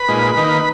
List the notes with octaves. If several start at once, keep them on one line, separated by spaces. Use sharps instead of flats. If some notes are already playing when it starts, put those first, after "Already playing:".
Already playing: B4 B5
A#2 G#3 D#4
D#3 A#3 D#4